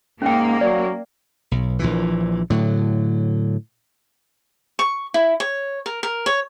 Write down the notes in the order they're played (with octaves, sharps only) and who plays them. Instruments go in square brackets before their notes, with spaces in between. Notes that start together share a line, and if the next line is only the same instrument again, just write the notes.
[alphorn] G#2 [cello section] A#3 [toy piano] C#4 G5
[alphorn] F#3 [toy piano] D5
[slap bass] B1
A#1 A#2 E3
A2 D3 F#3
[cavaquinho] C#6
E4
C#5
A#4
A#4
C#5